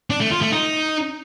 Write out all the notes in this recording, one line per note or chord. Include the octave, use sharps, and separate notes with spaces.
D4
A3
F4
A3
D#4